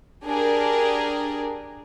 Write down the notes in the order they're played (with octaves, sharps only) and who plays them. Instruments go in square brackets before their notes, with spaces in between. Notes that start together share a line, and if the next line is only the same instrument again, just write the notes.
[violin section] D4 G4 G#4 A#4